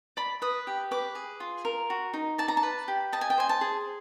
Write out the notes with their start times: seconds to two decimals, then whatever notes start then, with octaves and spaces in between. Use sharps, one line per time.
0.17 D5 B5
0.42 B4 D#6
0.67 G4
0.91 B4 D6
1.15 G#4
1.40 F4
1.65 A#4
1.90 F#4
2.14 D#4
2.38 D5 A5
2.48 A#5
2.57 A5
2.63 B4
2.88 G4
3.12 D#5 A5
3.21 G#5
3.30 G5
3.38 C5 G#5
3.49 A5
3.61 G#4